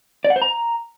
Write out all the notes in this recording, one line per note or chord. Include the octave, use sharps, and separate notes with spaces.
D5
F#5
C5
A#5